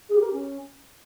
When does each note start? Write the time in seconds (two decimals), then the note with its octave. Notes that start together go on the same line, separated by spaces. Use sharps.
0.09 G#4
0.15 G4
0.21 A#4
0.27 G4
0.33 C#4